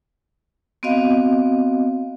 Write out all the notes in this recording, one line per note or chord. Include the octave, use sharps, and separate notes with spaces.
B3 C4 F#4 D#5 F5